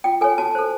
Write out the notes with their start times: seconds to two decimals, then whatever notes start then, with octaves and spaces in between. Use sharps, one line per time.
0.04 F4 G5
0.21 A4 C#5 G#5
0.38 F#4 A5
0.55 A4 C5